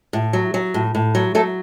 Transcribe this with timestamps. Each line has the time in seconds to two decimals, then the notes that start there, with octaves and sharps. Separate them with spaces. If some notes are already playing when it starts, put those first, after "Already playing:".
0.13 A2
0.33 F#3
0.54 F#3
0.74 A2
0.95 A2
1.15 F#3
1.35 F#3 A3 A4